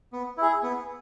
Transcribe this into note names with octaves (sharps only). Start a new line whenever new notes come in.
B3
E4 G#4
B3